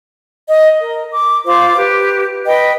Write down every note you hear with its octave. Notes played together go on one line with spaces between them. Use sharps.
D#5
A#4
D6
F4 C5 D6
G4 B4
B4 D#5 G5